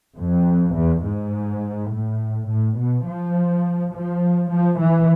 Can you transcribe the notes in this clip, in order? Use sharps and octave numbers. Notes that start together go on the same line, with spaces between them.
F2
E2
G#2
A2
A2
B2
F3
F3
F3
E3